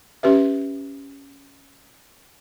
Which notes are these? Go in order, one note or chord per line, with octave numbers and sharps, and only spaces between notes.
C#4 G4 B4 E5